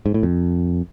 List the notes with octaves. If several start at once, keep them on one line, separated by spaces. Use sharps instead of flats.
G#2
A2
F2